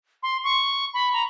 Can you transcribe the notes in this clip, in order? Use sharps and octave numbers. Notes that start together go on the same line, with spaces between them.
C6
C#6
B5
A#5